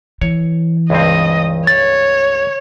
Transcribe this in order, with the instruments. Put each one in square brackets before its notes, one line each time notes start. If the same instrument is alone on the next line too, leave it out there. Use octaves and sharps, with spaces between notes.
[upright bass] E3 [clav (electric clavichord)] C#5
[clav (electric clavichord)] C#2 G2 C4 [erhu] D#5
[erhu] C#5 [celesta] A6